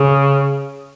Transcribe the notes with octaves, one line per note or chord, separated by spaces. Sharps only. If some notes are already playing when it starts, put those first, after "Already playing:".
Already playing: C#3